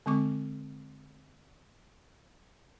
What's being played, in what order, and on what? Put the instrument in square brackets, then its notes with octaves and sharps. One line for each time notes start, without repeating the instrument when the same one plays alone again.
[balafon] D3 G#3 C4 C#6 D6